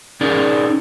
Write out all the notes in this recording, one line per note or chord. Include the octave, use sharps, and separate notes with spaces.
C#4 D#4 G#4 A#4 D5